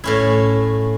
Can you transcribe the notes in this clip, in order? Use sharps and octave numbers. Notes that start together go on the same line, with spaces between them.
A2 C#4 E4